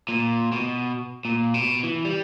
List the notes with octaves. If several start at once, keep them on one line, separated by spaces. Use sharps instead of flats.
A#2
B2
A#2
B2
E3
G3